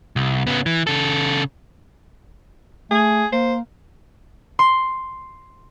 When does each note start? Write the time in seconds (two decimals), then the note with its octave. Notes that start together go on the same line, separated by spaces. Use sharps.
0.16 C2
0.47 C#3 B3
0.66 E3
0.87 C#3 A4
2.91 A3 G#4
3.32 A#3 C5
4.59 C6